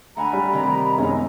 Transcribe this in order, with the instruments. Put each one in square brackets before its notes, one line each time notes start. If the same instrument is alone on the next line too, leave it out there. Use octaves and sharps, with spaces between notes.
[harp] D2 F#5 G#5 [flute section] A#5 B5
[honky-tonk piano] G3
[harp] C3 D#3
[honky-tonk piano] F#2 G#3 C#4 [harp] B3 D#4